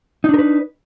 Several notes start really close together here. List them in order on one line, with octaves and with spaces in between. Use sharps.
D#4 D4 A#4 B4